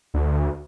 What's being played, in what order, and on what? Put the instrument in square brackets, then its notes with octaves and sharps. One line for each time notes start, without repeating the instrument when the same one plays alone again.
[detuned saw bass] D2